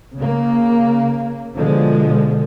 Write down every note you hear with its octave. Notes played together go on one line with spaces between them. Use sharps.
C#3 A#3
B2 D3 F3 G#3